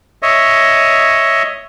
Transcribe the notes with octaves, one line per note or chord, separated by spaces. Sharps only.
C#5 D#5 E5